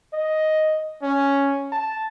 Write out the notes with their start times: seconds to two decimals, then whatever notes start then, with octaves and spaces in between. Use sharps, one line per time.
0.13 D#5
1.02 C#4
1.72 A5